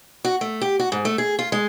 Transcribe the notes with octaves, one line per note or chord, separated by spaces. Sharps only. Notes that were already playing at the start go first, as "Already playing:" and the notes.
F#4
A3
G4
F#4
G#2
A3
G#4
F4
G#3